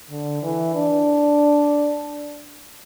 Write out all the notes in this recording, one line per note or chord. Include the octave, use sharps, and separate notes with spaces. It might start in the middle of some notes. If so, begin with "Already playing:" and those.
D3
E3
D4